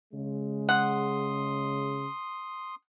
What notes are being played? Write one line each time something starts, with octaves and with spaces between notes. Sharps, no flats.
C#3 G#3
F#5 C6 D#6